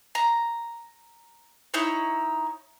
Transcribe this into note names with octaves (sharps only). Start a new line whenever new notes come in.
A#5
D#4 E4 C#5